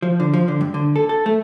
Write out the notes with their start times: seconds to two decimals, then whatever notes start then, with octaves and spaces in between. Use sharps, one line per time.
0.02 F3
0.20 D3
0.34 F3
0.48 D3
0.61 G2
0.74 D3
0.96 A4
1.09 A4
1.26 A3